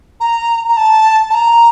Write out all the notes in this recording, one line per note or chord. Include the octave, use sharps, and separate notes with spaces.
A#5
A#5
A5
A5
A#5